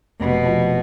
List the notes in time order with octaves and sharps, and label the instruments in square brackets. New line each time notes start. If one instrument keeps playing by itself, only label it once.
[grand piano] F1 [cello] B2
[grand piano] F3